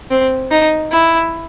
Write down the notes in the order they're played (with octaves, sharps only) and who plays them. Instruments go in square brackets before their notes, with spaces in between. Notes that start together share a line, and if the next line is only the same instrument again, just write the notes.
[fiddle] C4
D#4
E4